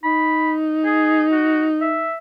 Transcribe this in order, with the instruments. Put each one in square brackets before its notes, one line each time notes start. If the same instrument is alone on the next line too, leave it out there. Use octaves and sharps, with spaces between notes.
[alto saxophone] D#4 [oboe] B5
[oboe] G#4
F#4
E5